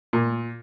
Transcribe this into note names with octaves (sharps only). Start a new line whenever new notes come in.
A#2